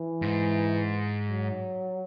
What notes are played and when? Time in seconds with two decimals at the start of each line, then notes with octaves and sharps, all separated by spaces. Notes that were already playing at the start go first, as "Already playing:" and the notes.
Already playing: E3
0.22 G#2
1.29 F#3